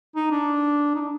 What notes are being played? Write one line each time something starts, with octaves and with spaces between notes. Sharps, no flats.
D#4
D4
D#4
D4